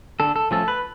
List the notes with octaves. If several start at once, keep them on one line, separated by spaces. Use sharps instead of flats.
D3 A4
A4
F3 A3 C#4 A4
B4